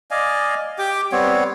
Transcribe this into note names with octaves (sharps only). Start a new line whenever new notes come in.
D5 D#5 F5 G#5
G4 G5 D6
G3 B3 C4 C#5